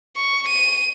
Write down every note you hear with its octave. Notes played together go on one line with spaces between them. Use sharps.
C#6
D#7